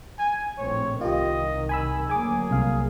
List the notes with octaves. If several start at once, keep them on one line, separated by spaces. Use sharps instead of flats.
G#5
A#1 A2 C4 C#5
C2 D#3 F4 G4 D#5
G#5 B5 E6
D2 F#3 A#3 G#4 G#5 D6
C2 F5